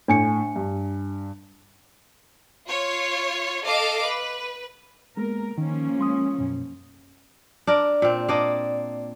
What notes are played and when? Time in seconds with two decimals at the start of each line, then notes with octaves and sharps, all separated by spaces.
0.08 A2 D4 G#5 C#7
0.56 G2
2.67 F4 C#5
3.65 A4 D#5 F5 D6
4.01 B4
5.17 G#3 A#3 B3 A#4
5.58 D#3 F3 A#3 C#4
5.99 G#3 C6 D#6
6.39 F#2 B2
7.67 D4 A#4 D5
8.02 A#2 C4
8.29 A#3 D4 D#5